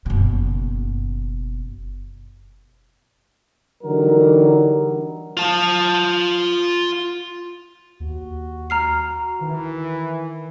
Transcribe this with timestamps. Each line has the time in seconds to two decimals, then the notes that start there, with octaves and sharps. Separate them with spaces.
0.06 F#1 B2
3.84 D3 E3 F#3 G3 D#4 A#4
5.37 F4 A5
8.00 D#2 F#4
8.70 A#5 F6 C7
9.41 D#3 E3